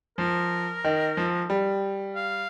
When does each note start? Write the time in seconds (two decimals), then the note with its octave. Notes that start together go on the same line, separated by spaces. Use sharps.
0.18 F3 A#4
0.84 D#3
1.17 F3
1.50 G3
2.16 F5